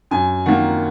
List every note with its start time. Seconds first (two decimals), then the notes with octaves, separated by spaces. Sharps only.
0.11 F#2 G#5
0.46 D#3 A#3 F#5